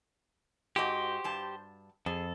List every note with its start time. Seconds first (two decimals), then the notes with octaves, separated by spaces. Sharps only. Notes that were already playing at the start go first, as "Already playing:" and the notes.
0.76 G#2 F#4 G4 C5 D#5
1.24 G2 A5
2.06 F2 G#4 A4